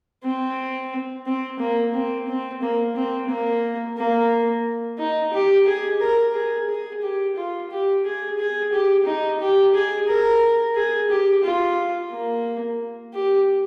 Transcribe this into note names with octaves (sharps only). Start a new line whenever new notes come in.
C4
C4
A#3
C4
C4
A#3
C4
A#3
A#3
D#4
G4
G#4
A#4
G#4
G#4
G4
F4
G4
G#4
G#4
G4
D#4
G4
G#4
A#4
G#4
G4
F4
A#3
G4